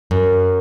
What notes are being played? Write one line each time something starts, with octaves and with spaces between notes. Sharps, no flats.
F#2